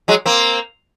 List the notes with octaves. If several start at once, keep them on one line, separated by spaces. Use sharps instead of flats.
F#3 G#3
A#3 C4